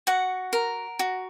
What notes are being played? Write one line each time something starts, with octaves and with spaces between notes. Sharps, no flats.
F#4 F#5
A#4
F#4